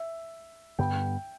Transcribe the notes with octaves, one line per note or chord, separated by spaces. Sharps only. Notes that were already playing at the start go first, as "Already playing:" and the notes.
Already playing: E5
G2 D3 G3 B3 G5